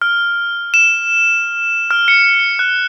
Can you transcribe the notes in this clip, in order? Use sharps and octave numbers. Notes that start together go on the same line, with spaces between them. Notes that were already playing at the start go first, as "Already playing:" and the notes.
F6
E7
F6
C#7
F#6